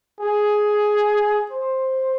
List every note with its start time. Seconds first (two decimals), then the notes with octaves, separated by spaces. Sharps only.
0.20 G#4
1.51 C5